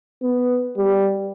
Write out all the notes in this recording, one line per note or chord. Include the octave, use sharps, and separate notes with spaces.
B3
G3